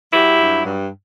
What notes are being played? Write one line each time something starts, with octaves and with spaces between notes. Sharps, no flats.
F#3 E4 G4
G2
G2